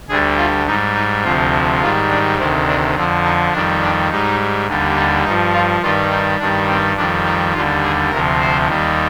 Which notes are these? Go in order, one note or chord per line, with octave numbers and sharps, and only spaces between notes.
D2 D3 G3 G#4
F4
G#2 G3 D#4
D#4
D2 C3 F3 F4
G#2 D#3 G3 F4
D4
D2 C3 D#3 C4
D4
F2 D3 F3 C4
D#4
F2 D#3 G3 D4
D4
G#2 G3 D#4
D#2 D3 G3
D#4
G2 F3 D#4
F4
G2 D#3 G3 F4
D#4
G2 D#3 G3 D4
C4
F2 D#3 G3 D4
D#4
D#2 D3 G3 F4
G#4
D2 C3 F3 A#4
C5
D#2 D#3 G3